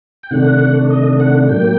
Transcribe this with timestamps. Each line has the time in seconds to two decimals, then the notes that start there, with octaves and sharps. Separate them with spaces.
0.23 G5
0.31 C3 D#3 A3 D4 F#5
0.90 D#5
1.20 F#5
1.49 A2 F#3 A#3 G5